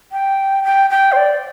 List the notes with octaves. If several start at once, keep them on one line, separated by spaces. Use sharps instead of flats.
G5
G5
G5
C5
D5